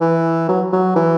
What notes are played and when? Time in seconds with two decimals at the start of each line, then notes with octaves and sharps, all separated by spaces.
0.01 E3
0.49 F#3
0.72 F#3
0.96 E3